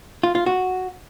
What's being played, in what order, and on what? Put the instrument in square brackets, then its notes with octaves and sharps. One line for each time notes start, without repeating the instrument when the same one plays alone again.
[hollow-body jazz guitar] F4
F4
F#4